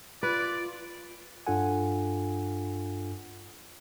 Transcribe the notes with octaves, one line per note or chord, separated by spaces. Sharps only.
F4 B4 D5
G2 D4 F4 A4 F#5 G#5